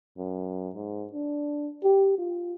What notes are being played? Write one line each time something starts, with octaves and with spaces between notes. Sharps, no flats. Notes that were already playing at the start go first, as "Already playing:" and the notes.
F#2
G#2
D4
G4
F4